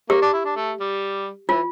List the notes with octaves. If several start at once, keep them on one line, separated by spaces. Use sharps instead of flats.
A#3 G4
D4
E4
D4
A3
G3
E3 F4